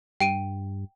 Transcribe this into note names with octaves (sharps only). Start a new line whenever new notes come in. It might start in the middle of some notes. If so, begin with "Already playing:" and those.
G2 G5 D7 D#7